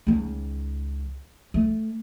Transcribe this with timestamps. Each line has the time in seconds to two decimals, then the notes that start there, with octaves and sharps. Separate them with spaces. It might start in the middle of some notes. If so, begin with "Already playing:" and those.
0.07 C#2 D#3
1.54 A3